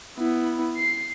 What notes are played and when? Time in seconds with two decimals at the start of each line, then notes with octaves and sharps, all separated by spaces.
0.18 B3 E4
0.77 C7